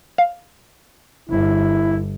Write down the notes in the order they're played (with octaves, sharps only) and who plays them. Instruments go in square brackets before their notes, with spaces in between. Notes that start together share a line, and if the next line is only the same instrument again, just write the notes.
[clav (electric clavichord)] F5
[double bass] G1 [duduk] E4